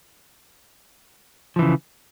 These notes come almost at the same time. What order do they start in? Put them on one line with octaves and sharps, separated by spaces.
F3 E3 C#3